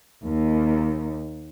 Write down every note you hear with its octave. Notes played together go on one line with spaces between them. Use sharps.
D#2